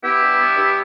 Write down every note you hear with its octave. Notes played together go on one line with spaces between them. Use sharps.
B3 E4 G4
G2
B3
G2